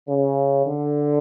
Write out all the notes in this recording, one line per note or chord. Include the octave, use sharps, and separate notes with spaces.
C#3
D3